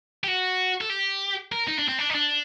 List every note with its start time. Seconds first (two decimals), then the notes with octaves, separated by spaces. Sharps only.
0.24 G4
0.28 F#4
0.81 A4
0.90 G4
1.52 A#4
1.68 D#4
1.78 D4
1.88 C4
1.99 D4
2.09 D#4
2.14 D4